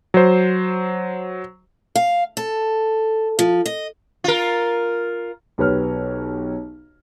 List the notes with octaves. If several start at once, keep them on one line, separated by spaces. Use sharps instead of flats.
F#3 C5
F5
A4
F3
D#5
F4 A#4
B1 G4 B4 C#5 F6